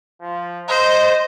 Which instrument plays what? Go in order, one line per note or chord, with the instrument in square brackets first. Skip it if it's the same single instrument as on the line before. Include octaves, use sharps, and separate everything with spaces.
[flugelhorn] F3
[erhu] C5 [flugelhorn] D#5